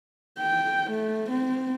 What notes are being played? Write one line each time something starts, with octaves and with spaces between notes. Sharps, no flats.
G5
A3
C4